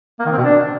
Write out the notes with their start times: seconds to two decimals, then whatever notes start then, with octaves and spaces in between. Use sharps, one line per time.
0.20 A#3
0.26 D#3
0.32 C4
0.38 B2
0.44 D4